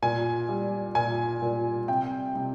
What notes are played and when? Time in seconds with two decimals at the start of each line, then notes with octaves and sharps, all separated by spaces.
0.02 A#2 G#5
0.49 G3
0.95 A#2 G#5
1.42 A#2
1.88 C3 G5
2.35 C3